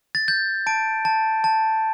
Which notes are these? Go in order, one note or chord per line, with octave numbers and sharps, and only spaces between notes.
A6
G6
A5 D7
A5
A5